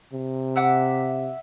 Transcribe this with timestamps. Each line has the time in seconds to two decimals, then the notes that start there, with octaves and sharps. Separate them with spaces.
0.13 C3
0.56 E5 F#5 D6